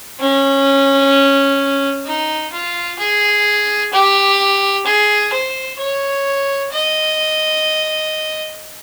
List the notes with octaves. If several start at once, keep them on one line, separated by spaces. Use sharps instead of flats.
C#4
D#4
F4
G#4
G4
G#4
C5
C#5
D#5